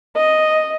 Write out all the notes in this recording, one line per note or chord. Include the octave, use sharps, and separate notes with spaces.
D#5